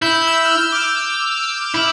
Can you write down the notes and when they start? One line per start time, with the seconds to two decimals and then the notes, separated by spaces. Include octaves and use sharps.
0.02 E4 G6
0.27 E6 G6
0.45 F6
0.59 E6
0.72 D6 F6
1.74 E4